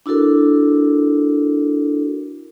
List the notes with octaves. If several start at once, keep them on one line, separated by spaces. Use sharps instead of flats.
D4 E4 F#4 A4 A#4